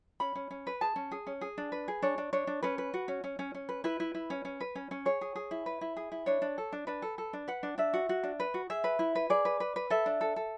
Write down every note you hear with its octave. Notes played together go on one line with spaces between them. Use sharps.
C#4 B5
C#4
C#4
B4
G#4 A5
C#4
G#4
C#4
G#4
D4
B4
G#4
D4 C#5
D4
D4 C#5
D4
C#4 B4
B4
F#4
C#4
C#4
C#4
C#4
B4
E4 B4
E4
E4
C#4
C#4
B4
C#4
C#4
G#4 C#5
G#4
G#4
E4
B4
E4
G#4
E4
D4 C#5
D4
A4
D4
D4 B4
A4
A4
D4
B4 F#5
D4
D4 E5
F#4
F#4
D4
B4
F#4
G#4 E5
B4
E4
B4
G#4 D5
B4
B4
B4
A4 E5
D4
A4
A4